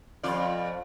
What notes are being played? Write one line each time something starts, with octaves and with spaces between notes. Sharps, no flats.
F2 F4 D5